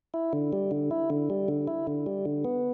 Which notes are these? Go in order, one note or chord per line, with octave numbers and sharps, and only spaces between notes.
E4
D3
G3
D3
E4
D3
G3
D3
E4
D3
G3
D3
B3